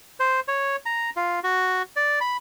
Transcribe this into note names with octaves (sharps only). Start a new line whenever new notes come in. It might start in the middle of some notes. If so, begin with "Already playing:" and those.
C5
C#5
A#5
F4
F#4
D5
B5